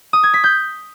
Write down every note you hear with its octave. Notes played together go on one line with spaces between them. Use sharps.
D#6
G#6
B6
G6